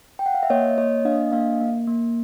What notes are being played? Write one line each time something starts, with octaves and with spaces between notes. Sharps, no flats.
G5
F#5
F5
E5
A#3 C#5 D#5
A#3 C#5 D#5
D4 D#5 F5
A#3 D#5 F5
A#3
A#3